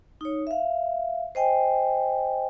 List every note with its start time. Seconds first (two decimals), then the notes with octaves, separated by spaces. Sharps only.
0.21 D#4 C#5
0.47 E5 F5
1.35 C5 D#5 G5 G#5